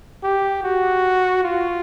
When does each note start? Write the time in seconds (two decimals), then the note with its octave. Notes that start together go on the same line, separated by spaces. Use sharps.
0.23 G4
0.63 F#4
1.43 F4